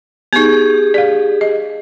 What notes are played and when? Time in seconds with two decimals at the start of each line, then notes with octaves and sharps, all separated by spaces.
0.33 B3 D#4 G4 G#4
0.94 D5 F5
1.41 D#5